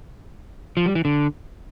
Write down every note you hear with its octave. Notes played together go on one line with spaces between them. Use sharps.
F3
G3
E3
D3